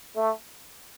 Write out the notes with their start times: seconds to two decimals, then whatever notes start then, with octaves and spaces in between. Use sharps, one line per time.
0.16 A3